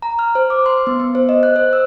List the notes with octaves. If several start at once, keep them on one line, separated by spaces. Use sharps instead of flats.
A#5
F6
C5
D6
C6
B3
B3
C5
D#5
F#6
C5
E6